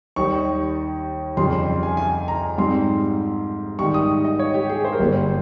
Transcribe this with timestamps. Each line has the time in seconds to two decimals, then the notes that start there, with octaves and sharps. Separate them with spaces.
0.16 D#2 D#3 G3 C#6
1.37 F2 C#3 G3 C6
1.52 C6
1.83 G#5
1.97 G#5
2.28 A#5
2.58 G#2 G3 C4 C6
3.79 G#2 D#3 G3 C#6
3.94 D#6
4.24 D#5
4.39 C#5
4.54 G4
4.69 G#4
4.85 C5
4.92 A#4
4.99 G1 G2 G3 A#3 C5